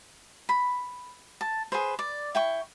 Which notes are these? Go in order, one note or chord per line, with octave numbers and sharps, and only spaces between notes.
B5
A5
G#4 B4 C5
D5
E4 G5 C#6